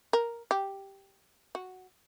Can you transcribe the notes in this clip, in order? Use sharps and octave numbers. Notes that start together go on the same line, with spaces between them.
A#4
G4
F#4